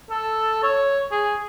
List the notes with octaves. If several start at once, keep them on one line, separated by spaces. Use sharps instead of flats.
A4
C#5
G#4